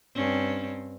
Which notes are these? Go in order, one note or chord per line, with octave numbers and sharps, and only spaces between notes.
G2 C4 C#4